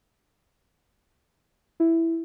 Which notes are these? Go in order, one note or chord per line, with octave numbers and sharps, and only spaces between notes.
E4